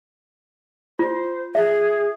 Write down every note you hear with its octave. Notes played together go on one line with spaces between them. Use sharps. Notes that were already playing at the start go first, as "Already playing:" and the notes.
F4 C5
G#4 E5